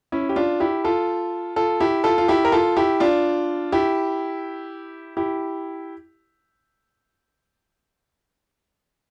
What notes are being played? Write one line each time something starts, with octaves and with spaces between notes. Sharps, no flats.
C#4 E4
G4
D4 F4
E4 G4
F4 A4
F4 A4
E4 G4
F4 A4
F4
E4 G4
A#4
F4 A4
E4 G4
D4 F4
E4 G4
E4 G4